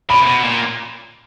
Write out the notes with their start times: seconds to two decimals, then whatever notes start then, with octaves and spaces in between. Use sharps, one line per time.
0.09 A#2 B5
0.22 C3
0.26 B2
0.44 A#2